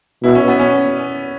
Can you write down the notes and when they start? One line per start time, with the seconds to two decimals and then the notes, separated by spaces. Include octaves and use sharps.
0.24 B2 E4
0.35 C#4
0.48 B3
0.59 C#4